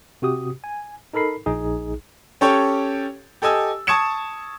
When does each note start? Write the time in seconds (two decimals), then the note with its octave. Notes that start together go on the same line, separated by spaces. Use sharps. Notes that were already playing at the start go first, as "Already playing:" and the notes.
0.22 C3 F#4 G4 D#6
0.64 G#5
1.13 D#4 A4 A#4 B5 C7
1.46 A#1 D#4 G#4
2.41 C#4 G4 A4 C#5 G5
3.42 G4 A4 D#5 G#5 E6
3.87 A5 C#6 D#6 G#6 C#7 E7